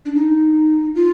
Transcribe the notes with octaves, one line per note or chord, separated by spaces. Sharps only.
D4
D#4
F4